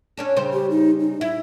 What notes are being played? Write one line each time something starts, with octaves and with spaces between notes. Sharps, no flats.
C#4 D4 A4
C#3 G3 C5
G4
D#4
D#4
E4 E5